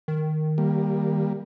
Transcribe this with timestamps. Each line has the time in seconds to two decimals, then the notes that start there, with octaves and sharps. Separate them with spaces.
0.08 D#3
0.58 G3 A#3